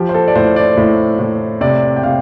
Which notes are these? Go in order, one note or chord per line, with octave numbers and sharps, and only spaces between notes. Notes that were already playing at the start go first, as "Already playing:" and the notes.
Already playing: F3 G4
C5
A4
D5
A2 C5
D5
A2
A2
C3 D5
G5
C3 F5